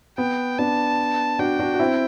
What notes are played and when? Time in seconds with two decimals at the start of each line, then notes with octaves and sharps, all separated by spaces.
0.18 B3 G5
0.59 B3 D4 A5
1.39 D4 F#4 G5
1.59 D4 F#4
1.74 F#4
1.79 C4 E4